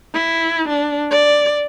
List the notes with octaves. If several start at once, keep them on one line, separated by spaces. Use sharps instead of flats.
E4
D4
D5